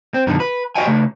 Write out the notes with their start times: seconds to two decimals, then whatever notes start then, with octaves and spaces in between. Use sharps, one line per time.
0.14 C4
0.27 F#2 B2 D3 D#3
0.40 B4
0.75 F#4 G4 C#5 D#5 G5 G#5
0.87 C#3 A3